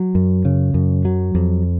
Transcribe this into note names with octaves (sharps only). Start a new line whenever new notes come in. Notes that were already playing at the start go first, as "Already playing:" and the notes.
Already playing: F#3
F#2
C#3
F#2
F#3
F2